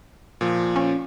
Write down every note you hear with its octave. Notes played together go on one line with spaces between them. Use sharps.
A#2 F3
C#4